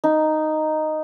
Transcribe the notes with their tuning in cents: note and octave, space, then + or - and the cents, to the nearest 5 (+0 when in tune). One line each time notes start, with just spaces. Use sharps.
D#4 -5